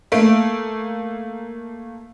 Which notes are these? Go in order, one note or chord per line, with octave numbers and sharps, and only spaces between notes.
A3 A#3 D7